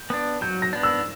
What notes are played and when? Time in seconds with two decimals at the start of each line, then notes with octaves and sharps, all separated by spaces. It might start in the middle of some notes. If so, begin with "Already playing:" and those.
Already playing: G6
0.10 B3 D4
0.41 F#3 G6
0.62 A#6
0.73 B3 D4
0.83 E6